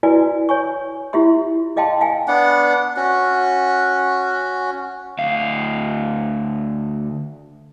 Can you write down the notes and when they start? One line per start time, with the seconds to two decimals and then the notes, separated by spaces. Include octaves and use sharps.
0.03 E4 F#4 B4 D5 G#5
0.49 C#5 G#5 C#6
1.13 E4 F4 G4 E5 C6
1.76 G#4 D#5 F5 G5 A5 C6
2.01 F5 G5 G#5
2.28 B3 D4 F#5
2.97 C#4 F#4
5.18 D2 F5